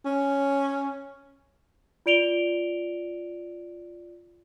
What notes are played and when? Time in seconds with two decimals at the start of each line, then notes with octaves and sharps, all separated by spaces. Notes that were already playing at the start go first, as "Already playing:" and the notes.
0.05 C#4
2.06 F4 D5 D7 F7 G7